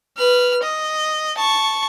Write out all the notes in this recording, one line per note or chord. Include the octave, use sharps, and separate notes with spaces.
B4 F6
D#5
A5 C#6